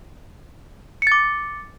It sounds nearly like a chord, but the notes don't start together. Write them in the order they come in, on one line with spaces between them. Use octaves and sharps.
C#7 A6 D6